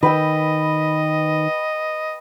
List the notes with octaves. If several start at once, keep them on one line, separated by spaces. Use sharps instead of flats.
D#3 B4 D#5 G5 E6